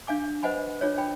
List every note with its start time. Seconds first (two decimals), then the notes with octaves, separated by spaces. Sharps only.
0.07 D4 F5 G#5 D6
0.43 B4 C5 D#5 F#5 G#5 B5
0.81 D4 F4 G#4 C#5
0.98 G5 B5